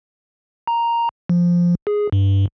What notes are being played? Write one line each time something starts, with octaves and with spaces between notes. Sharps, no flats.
A#5
F3
G#4
G2